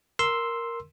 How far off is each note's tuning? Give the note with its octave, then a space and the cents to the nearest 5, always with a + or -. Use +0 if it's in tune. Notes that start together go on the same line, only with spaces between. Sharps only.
A#4 +0 C6 +0 E6 +0